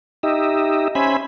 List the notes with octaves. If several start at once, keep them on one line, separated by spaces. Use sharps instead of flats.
D#4 G4 D#5 E5
C#4 C5 E5 G#5 B5